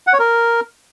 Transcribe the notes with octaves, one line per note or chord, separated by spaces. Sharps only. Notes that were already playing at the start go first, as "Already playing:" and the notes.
F#5
C#5
A#4